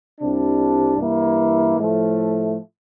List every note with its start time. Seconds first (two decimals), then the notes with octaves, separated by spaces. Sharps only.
0.20 C2 C3 G3 D4
0.98 G2 E3 A#3 E4
1.78 A2 F3 A3